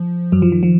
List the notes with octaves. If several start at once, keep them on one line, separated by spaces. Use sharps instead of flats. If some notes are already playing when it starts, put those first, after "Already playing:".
Already playing: F3
F#2 F#3
F3
D#3
F3